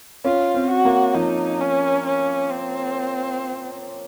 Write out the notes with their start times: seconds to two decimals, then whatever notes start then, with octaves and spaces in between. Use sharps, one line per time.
0.25 C#4 F4
0.54 C4
0.70 F#4
0.85 A#3
1.15 F3 D#4
1.61 C#4
2.06 C#4
2.51 C4